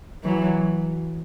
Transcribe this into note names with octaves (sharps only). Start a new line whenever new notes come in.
E3 F#3